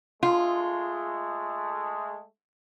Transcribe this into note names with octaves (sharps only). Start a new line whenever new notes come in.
G#3 A3 F4